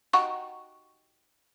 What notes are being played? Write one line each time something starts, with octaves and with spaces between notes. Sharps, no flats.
D#4 F#4 G4 C#6